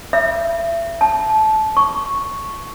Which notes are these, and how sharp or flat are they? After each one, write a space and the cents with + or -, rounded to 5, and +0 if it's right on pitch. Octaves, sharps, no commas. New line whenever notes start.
E5 +30
A5 -20
C#6 +0